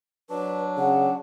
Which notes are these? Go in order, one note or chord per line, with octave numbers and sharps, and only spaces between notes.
F#3 D4 B4
C#3 F#5